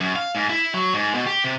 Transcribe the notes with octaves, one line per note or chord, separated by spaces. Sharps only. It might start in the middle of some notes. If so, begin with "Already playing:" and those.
F#2
F5
G#2
E4
F#3
G#2
B2
G4
C3